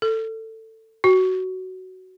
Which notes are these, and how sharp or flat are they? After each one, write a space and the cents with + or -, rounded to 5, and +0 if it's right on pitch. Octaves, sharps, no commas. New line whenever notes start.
A4 +20
F#4 +10